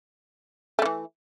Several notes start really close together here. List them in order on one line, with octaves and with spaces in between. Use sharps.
A3 D3 E3